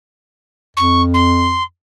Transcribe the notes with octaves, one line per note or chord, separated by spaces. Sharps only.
F2 C#6
C6